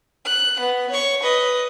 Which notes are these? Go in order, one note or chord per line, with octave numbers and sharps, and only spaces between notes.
F#6
B3
C#5 C#6
B4 D#5